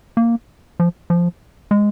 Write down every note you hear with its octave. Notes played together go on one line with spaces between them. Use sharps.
A#3
F3
F3
G#3